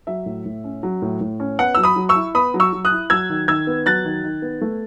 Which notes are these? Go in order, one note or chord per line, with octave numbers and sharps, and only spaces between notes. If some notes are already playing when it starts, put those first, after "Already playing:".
F#3 E5
A2
A2
C#4
F#3
A2
A2
C#4
B3 F#5
F#3 E6
B5 D#6
F#3
C#6 E6
E4
B3 B5 D#6
F#3
C#6 E6
F#3
D#6 F#6
E4
F#3 E6 G#6
D#3
D#3 E6 G#6
B3
F#3 F#6 A6
D#3
D#3
B3
A3